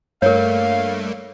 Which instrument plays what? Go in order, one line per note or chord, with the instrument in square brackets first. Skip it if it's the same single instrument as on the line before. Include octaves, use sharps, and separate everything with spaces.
[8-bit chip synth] G2 A3 A#3 [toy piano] A#4 C#5 [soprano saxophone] F5